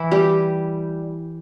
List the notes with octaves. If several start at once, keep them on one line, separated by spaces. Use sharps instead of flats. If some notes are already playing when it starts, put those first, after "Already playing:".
Already playing: E3 E4
G3 G4